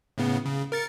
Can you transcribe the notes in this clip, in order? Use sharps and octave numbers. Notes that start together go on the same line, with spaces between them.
A2 C#3 B3
C#3
A#4 A6 C#7